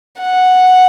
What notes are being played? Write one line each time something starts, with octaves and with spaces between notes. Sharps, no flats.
F#5